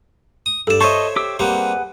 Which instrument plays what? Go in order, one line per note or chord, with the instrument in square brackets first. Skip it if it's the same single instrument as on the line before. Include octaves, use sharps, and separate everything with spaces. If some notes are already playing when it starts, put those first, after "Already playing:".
[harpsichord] D#6
[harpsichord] G2 D5 [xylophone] A4 E7
[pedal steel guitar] A4 D#5 [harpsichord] C5 C#5 E5 [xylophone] C#6
[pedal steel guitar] G4 D6 E6
[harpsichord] G3 A#3 C4 [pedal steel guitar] G#4 B4 F#5